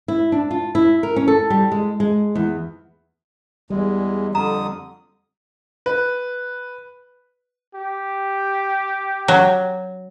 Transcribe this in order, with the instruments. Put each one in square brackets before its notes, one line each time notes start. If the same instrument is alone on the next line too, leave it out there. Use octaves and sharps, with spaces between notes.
[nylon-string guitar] E4
D4
F4
E4
A#4
C#4
A4
G3
G#3
G#3
E2
[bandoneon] E2 G#3 [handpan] G3
[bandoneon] F2 D3 D#6 [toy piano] A#5
[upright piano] B4
[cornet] G4
[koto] F#3